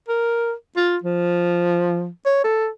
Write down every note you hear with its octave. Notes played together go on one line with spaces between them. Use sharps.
A#4
F4
F3
C#5
A4